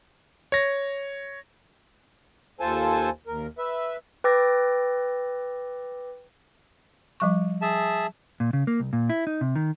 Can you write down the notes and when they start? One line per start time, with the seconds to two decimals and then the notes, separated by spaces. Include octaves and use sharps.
0.52 C#5 A#6
2.60 D#2 F4 A4 C5 G#5 A5
3.27 D#2 A#4
3.58 B4 E5
4.24 B4 G5 D6 E6 A6 A#6
7.20 F3 G3 C#6
7.62 G#4 E5 A5
8.40 A#2
8.53 C#3
8.67 A#3
8.80 C2
8.93 A#2
9.10 E4
9.27 D#4
9.41 C3
9.56 D#3